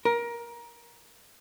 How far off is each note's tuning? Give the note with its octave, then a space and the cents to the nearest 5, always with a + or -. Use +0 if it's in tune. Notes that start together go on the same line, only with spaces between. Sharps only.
A#4 +20